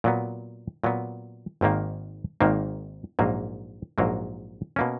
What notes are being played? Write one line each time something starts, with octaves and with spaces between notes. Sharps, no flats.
A#2 F#3 B3
A#2 F#3 B3
G#1 G#2 D#3 A#3
G#1 G#2 D#3 A#3
A#1 G#2 F#3 A#3
A#1 G#2 F#3 A#3
B2 A#3 C#4